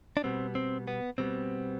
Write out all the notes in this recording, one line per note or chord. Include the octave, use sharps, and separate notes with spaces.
D4
B2 G3 B3 C4
C4
B3
B2 G3 B3 C4